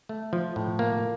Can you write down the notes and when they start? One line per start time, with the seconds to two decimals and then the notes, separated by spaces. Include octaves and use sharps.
0.09 A3
0.33 F3
0.56 A2
0.79 A#3